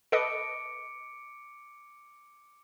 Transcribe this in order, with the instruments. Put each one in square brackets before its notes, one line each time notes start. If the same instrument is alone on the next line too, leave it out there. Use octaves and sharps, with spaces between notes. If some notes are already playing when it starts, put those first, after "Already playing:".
[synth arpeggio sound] A4 B4 D#5 [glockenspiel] D6 C#7 D7